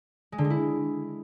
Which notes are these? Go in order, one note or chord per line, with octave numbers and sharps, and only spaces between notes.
G#3
D3
G#3
E4